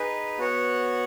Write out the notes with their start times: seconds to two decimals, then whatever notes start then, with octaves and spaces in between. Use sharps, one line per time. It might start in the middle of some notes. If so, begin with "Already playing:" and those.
Already playing: D#4 G#4 B4
0.38 B3 F#4 C#5 F#5